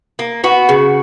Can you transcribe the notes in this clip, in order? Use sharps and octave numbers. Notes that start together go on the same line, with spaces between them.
A#3
B3 F#4
C#3